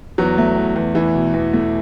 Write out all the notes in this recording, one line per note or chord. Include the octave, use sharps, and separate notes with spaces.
E2 F#3
A3
E2
E2
E3 E4
B2
E2
A3